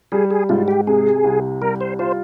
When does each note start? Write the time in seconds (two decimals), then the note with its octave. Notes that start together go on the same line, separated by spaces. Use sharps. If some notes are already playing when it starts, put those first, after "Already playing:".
0.12 G3 G#4
0.31 G#4
0.49 G#2 F4
0.68 G4
0.87 C3 G#4
1.24 C2
1.62 G3 A#4
1.81 C5
1.99 F4 C5